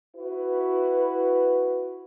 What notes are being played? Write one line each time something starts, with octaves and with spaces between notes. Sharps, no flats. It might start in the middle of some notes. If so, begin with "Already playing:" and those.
E4 F#4 B4